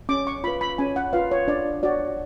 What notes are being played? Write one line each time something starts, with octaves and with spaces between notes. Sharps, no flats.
C#4 D6
C#6
F4 B4 B5
B5
C#4 G#5
F#5
F4 B4 F5
C#5
D4 D5
F#4 C#5 D5